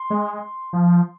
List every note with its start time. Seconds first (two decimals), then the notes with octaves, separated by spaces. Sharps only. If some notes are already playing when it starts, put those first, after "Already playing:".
Already playing: C6
0.10 G#3
0.73 F3